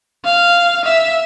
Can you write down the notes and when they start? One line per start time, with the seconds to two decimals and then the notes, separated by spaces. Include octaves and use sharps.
0.25 F5
0.85 E5